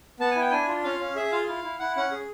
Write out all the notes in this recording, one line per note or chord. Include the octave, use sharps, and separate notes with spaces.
B3 A5
G#5
E4 G5
D4 G#5
F4
C#4 F5
C#4
G#4 E5
F4 F5
E4 F5
E4
E4 F#5
C#4 F#5
G#4